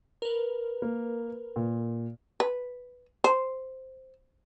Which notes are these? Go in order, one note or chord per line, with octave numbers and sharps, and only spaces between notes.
A#4 B4
A#3
A#2
B4
C5